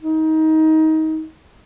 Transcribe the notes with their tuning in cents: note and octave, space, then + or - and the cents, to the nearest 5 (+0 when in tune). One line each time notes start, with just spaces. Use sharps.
D#4 +20